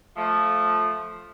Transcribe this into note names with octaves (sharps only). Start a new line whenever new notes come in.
F3 A3